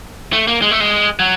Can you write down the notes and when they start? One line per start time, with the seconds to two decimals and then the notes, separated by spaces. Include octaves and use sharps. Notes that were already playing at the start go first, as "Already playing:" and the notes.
0.33 A3
0.47 A#3
0.62 G#3
0.71 A3
0.80 G#3
1.19 F#3